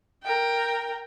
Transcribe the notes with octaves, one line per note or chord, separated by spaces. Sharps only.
A#4 G5